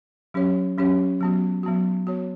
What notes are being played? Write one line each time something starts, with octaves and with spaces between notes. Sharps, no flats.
F#3 C#4 G4 C#5
F#3 C#4 G4 C#5
F#3 B3 F#4
F#3 B3 F#4
B3 F#4 C#5